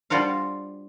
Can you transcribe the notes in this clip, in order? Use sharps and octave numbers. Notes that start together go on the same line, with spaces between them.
G3 D4 F4 F#4 C5 F5